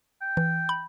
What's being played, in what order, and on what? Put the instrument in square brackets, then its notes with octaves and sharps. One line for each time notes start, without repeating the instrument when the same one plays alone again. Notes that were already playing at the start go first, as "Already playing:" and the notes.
[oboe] G5
[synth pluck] E3
B5